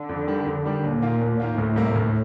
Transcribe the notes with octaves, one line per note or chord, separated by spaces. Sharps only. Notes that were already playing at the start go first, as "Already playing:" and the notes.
Already playing: D3
F2
D#3 G3 D4 G4
F2
D#3 G3 D4 G4
D#2 A#2
D#3 A#3 F4
D#2
D#3 A#3 F4
D2 A2
C3 G3 A#3
D2